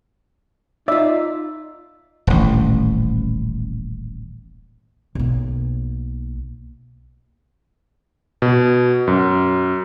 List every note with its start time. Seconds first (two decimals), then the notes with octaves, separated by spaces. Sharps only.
0.88 D#4 F4 D5 E5
2.27 D#1 A1
5.15 B1 A#3
8.42 B2
9.07 F#2